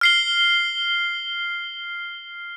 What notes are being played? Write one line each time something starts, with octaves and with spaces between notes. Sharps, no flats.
F6 C7 G7